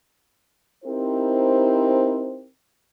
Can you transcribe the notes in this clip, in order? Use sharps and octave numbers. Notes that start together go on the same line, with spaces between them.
C4 D#4 E4 G4 A#4 C5